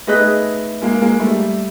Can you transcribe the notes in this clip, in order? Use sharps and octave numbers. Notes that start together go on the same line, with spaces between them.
A3 B3 D#4 G#4 B4 D#5
G#3 A#3
G#3 A#3
G3 A3